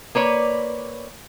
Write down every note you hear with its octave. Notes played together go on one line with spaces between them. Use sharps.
A#3 B4 C#5 D5